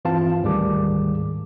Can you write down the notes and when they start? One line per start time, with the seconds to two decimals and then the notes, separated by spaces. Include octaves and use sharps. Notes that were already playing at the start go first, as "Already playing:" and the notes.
0.05 G2 E3 C4 F4 F5 A5
0.42 D2 G#2 D#3 G3 G#4 D6